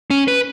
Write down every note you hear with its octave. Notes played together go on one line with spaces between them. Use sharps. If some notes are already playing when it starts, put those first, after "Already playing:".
C#4
B4